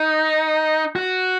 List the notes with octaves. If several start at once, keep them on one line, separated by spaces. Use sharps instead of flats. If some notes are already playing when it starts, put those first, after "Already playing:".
Already playing: D#4
F#4